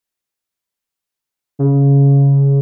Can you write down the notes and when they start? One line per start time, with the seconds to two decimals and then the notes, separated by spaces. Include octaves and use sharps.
1.59 C#3